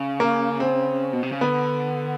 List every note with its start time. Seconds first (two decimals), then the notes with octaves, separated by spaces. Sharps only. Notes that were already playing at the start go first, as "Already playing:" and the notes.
Already playing: C#3
0.20 A#3
0.60 C4
1.13 B2
1.23 C3
1.32 C#3
1.41 D3 B3